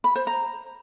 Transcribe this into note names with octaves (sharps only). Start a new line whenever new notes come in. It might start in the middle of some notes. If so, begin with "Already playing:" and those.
B5
C5
A#5